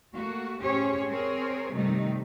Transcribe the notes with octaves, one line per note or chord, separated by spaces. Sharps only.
A3 A#3 F#4
A2 C#4 G4 G#4 C5 C#5
C4 G#4 A#4 C5 C#5
G2 C3 D#3 G3 A3 D#4